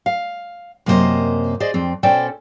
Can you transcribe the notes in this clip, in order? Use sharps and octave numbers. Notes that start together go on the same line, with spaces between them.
F5
F#2 C3 A#3 C#4 C5 D#5
G#4 C5 D5 D#5
F2 C4
B2 C#4 A4 C5 D5 G5